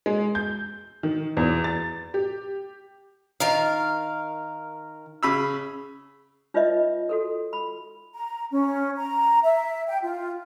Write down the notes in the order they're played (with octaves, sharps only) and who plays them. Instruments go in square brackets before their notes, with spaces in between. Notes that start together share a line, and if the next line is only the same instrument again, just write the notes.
[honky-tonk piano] G#3
G6
D#3
E2
A6
G4
[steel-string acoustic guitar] D#3 A#4 F5
[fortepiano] C#3 B5 E6
[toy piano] D#4 F4 B4 C#5 D#5 E5
F#4 A4 A#4
B5
[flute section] A#5
C#4
A#5
E5
G5
F4